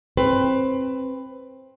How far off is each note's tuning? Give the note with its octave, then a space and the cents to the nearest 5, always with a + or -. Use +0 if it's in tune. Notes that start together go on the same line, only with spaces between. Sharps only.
C4 +15 B4 +15